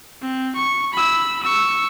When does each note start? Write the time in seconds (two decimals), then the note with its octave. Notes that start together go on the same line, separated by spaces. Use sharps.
0.22 C4
0.56 C#6
0.94 B5 E6
1.43 C#6 E6